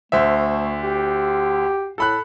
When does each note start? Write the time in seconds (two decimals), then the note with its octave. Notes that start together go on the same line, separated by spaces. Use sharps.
0.12 D2 A3 C5 E5
0.83 G4
1.98 A2 A4 B5 F#6